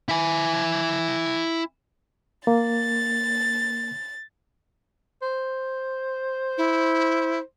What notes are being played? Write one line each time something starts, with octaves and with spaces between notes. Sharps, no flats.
E4 G#5
A#3 A6
C5
E4